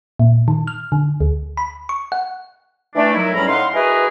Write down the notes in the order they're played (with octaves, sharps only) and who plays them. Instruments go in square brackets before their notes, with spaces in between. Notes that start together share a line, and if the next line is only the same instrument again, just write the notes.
[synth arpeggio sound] A#2
D#3
F6
D3
D2
B5
C#6
F#5
[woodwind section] E3 A3 D4
D#3 F#3 E4
E2 A2 G3 C#4 A#5 B5
A2 D#4 F5 F#5 C6
G#3 E4 F#4 G#4 A#4 B4